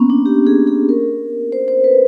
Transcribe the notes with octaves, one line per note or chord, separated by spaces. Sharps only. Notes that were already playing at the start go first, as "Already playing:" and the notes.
Already playing: A#3 B3 C#4
D4
G4
G#4
G#4
A#4
C5
C5
B4